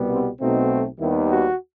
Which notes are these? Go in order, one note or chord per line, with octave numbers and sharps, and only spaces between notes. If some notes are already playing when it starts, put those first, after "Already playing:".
Already playing: C2 B2 G3 B3
C4
B1 B2 A3 C4 D#4
D#2 D#3 G3 B3 E4
F#4